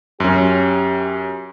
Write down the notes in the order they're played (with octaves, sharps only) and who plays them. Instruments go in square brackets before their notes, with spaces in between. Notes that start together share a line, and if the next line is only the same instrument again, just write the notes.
[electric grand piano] F#2 C#4 [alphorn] G4